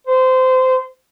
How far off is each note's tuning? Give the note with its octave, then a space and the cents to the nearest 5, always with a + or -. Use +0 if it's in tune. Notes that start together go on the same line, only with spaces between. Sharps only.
C5 -20